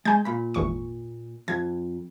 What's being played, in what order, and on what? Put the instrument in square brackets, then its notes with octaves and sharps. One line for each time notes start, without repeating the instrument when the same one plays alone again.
[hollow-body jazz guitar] G#3 [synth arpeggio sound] G#5 G6
[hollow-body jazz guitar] A#2 B5
[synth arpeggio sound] G#1 E2 C#6
[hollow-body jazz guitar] F2 [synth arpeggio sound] G#6